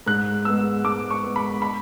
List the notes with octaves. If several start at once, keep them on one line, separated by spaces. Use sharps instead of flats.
G#2 F#6
G#3 B3 E6
G#2 D6
C#6
G#3 B3
B5
B5